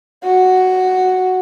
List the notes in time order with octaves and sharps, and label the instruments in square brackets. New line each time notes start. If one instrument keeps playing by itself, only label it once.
[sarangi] F#4